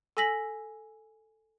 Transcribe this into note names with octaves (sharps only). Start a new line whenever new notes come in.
A4 G#5 E6 A#6 B6 F#7